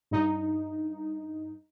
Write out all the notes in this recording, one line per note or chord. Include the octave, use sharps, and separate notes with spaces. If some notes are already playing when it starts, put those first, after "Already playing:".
G2 D#4